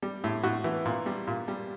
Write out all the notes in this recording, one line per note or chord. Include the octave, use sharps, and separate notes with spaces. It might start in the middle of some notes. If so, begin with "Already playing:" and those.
G3
A2
A2 F#4
E3
A#2
G3
A#2
G3